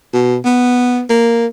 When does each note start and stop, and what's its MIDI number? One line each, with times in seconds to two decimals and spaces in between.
0.13 0.37 47
0.45 1.01 59
1.10 1.47 58